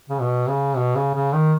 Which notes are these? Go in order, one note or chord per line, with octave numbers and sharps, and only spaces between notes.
C#3
B2
C#3
B2
C#3
C#3
D#3